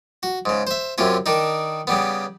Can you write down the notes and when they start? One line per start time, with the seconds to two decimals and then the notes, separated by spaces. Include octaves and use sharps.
0.23 F#4
0.46 G#2 C#3
0.67 C5 E5
0.98 F#2 C3 C#4 F4
1.26 D#3 D4 D#4
1.87 C#3 G3 B3